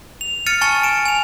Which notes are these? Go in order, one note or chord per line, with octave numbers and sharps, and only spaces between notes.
F7
F6 A6 C#7 D#7
G#5 A5 C#6 A6 C#7
D7 E7
G#5 F7